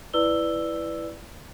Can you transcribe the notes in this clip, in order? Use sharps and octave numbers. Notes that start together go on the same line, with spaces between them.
E4 B4 D5 E6 G7